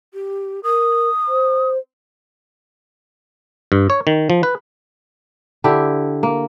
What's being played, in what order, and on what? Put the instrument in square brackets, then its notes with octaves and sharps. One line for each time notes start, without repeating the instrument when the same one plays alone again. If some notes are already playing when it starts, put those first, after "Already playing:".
[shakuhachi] G4
[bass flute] A#4 [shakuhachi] D#6
[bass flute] C5
[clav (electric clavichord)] G2
C#5
D#3
F3
B4
[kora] D3 E4 G4
A#3